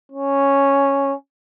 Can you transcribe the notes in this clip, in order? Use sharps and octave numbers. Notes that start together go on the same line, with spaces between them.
C#4